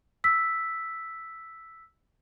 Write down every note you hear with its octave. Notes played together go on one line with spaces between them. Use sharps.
E6 B6